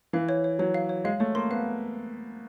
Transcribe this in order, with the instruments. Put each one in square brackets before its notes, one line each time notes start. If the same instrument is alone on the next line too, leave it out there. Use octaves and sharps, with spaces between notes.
[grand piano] E3 [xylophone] F5
[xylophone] C#5
C#5
[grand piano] F#3 [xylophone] C#5
[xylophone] F5
C#5
[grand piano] G#3 [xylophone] F5
[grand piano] A3 [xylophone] C#5
[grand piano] A#3 [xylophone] C6
[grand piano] B3 [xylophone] F5